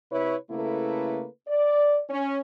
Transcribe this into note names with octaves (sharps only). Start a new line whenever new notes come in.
C3 E4 B4 C#5
C#3 A3 A#3 E4 A4 B4
D5
C#4